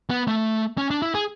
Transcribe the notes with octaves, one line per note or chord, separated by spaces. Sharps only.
B3
A3
C#4
D4
E4
G#4